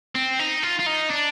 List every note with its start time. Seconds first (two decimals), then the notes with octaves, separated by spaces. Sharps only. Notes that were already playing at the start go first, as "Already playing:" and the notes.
0.15 C4
0.39 D#4
0.63 F4
0.79 F4
0.86 D#4
1.10 D4